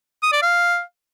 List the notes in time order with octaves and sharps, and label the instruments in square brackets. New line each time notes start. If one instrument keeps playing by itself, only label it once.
[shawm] D#6
D5
F5